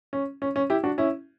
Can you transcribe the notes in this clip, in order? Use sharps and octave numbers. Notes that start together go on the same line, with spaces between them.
C#4
C#4
C#4
E4 G4
D4 F#4
C#4 E4